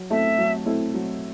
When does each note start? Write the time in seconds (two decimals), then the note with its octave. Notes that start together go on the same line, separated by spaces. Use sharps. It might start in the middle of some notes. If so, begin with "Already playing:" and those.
Already playing: F#3
0.10 A3 C4 E4 E5
0.38 F#3
0.66 A3 C4 E4
0.94 F#3